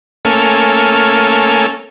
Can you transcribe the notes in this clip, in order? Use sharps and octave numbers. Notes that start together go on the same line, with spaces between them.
A3 A#3 C#4 A4 G#5 F6